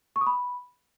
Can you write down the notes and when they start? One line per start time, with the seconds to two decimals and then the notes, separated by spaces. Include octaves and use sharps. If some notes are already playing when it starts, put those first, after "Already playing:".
0.16 C#6
0.21 D#6
0.26 B5